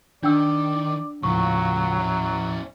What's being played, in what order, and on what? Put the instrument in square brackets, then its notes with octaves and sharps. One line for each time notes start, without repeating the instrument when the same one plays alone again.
[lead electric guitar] D#3 [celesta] D4 G5 E6 [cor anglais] D5
[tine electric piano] D#2 A2 F3 [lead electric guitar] C#3 F4 [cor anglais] F#3 [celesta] C#6
[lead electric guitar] C#4 E4